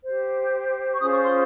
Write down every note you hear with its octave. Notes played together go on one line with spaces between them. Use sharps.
G4 C5
C#6
C#4 F4 G#4 C5 D#6
C#6
C6